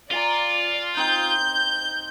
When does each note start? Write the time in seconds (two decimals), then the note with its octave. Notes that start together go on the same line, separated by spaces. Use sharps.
0.11 F4 D5 F5 G#5 A#5
0.97 C4 D#4 G6